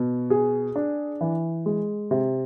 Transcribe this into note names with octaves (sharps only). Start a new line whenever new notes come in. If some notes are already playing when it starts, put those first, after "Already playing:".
Already playing: B2
G#4
D4
E3
G#3
C3